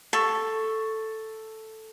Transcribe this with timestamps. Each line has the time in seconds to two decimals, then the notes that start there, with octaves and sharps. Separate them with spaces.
0.13 A4 C#6